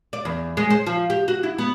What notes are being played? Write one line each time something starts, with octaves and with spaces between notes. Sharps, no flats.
D5
E2
G#3
C5
F3
G4
F#4
E4
B3